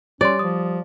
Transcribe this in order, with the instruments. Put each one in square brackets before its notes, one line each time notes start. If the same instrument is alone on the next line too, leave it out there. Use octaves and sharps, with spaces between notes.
[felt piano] G3 [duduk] C#4 [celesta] C#5 C6 [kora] D5
[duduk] F3 [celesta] D#6